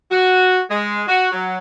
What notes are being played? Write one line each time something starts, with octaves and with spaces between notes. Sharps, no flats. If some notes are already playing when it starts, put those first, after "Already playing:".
F#4
G#3
F#4
F#3